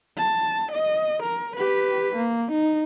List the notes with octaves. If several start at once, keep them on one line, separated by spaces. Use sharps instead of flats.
A5
D#5
A#4
G4 B4
A#3
D#4